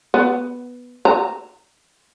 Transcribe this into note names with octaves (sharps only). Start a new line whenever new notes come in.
B3
A#5